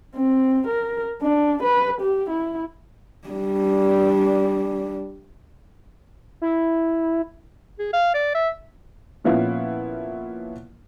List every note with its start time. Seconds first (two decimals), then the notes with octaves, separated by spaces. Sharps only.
0.16 C4
0.67 A#4
1.22 D4
1.63 B4
2.01 G4
2.30 E4
3.28 G3 D4
6.42 E4
7.79 G#4
7.94 F5
8.14 D5
8.35 E5
9.24 A#2 F3 B3 C#4 E4 F5